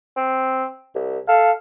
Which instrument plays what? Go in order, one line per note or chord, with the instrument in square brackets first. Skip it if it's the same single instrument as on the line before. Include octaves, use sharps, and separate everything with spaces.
[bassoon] C4
C2
[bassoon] A4 [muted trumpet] F5